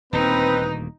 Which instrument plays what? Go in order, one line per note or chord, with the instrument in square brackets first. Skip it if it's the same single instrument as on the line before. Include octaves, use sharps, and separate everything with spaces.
[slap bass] D#1 D2 A#2 [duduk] C4 [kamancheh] D#4 [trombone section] B4